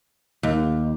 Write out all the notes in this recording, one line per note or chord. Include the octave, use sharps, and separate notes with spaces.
D#2